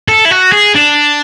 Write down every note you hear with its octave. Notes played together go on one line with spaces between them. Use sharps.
A4
E4
F#4
G#4
D4